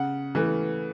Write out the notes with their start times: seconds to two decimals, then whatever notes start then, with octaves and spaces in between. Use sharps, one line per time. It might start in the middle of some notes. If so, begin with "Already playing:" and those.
Already playing: C#3 F#5
0.35 E3 A3